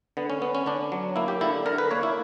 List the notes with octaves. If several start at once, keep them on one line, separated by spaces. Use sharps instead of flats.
D3 B3
C#4
B3
C#4
D3 D4
F#3
A#3 E4
G4
D3 E4
D3 A#4
B4
A#3 C#5
E4